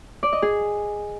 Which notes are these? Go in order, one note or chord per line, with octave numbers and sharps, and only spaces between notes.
D5
D#5
G#4